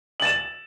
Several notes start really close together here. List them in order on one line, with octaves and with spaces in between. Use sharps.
F#7 A6 E7